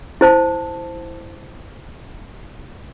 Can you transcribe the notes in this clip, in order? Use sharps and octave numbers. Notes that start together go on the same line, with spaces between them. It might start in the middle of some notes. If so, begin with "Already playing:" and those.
E4 C5 A5